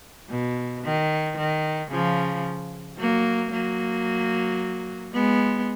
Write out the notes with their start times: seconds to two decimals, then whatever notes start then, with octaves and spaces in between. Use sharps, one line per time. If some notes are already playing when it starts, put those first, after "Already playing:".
0.30 B2
0.84 D#3
1.37 D#3
1.91 C#3 F3
2.98 F#3 A#3
3.52 F#3 A#3
5.14 G#3 B3